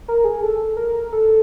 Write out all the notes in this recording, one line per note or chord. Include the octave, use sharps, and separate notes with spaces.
A#4
G#4
A4
A#4
A4